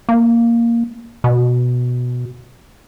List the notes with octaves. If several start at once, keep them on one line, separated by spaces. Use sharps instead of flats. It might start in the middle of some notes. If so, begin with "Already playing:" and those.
A#3
B2